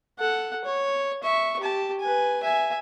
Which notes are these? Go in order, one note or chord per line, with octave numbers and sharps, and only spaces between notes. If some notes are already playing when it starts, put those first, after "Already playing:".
A4 F#5
C#5
E5 C#6
G4 A5
B4 G#5
E5 G#5